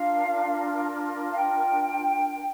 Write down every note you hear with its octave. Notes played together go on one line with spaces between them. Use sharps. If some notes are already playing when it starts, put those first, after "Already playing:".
Already playing: D4 F4 A#4 F5
F5
G5